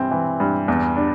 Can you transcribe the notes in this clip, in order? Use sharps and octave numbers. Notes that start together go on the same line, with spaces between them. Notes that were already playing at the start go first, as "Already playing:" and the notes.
Already playing: G2 E3 C4
E3
G2
E2
D4